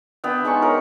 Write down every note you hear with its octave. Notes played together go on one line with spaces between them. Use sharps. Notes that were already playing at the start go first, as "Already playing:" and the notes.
B3 D4 E5 G5
G#3 D#4 B5 C#6
A#4 C#5